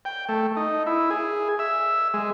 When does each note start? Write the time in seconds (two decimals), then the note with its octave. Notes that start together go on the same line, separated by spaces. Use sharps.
0.05 G5
0.29 A3
0.57 D#4
0.86 E4
1.10 G#4
1.59 E5
2.14 G#3